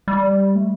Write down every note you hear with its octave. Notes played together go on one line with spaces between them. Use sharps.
G3
A3